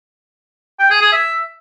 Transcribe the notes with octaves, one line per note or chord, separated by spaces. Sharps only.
G5
G#4
G#4
E5